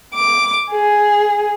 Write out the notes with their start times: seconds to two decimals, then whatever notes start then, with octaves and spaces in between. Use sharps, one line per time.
0.14 D6
0.71 G#4